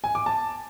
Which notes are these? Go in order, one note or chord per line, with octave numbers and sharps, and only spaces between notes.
G#5
D6
A5